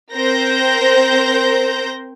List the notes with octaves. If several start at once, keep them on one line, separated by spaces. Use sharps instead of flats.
C4 A#4 C5 G6 A#6